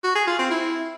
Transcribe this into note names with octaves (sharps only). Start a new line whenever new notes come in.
F#4
G#4
F4
C4
E4